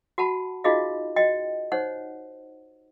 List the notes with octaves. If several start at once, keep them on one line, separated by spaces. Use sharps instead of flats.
F#4 F#5 A5 B5
D#4 F4 F#4 G#4 D#5 F5
F#4 D#5 G5
D#4 C5 C#5 F#5